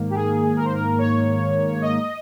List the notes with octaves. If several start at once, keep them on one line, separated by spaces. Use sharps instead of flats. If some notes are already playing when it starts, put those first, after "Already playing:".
Already playing: G#2 D#3 A#3
G4
G#4
A#4
C5
A#4
C#5
D#5